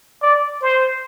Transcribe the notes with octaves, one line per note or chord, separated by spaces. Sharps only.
D5
C5